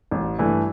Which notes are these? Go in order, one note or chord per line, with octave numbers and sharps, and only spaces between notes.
A1
G2 E3 A3